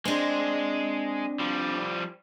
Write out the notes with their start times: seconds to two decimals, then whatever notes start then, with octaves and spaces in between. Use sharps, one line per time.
0.05 G#3 C4 D4 C5
1.40 F3 G3